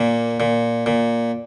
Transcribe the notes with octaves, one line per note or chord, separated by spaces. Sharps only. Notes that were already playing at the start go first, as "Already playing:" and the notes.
Already playing: A#2 A#3
A#2
A#2